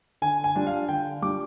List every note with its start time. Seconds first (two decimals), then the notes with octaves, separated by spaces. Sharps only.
0.22 D3 G#5
0.44 G#5
0.55 G3 D4 F4
0.67 F5
0.88 D3 G5
1.22 G3 D4 F4 D6